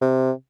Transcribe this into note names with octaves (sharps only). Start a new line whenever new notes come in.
C3